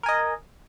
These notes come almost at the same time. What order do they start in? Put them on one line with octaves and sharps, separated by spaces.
A#4 G#5 D#5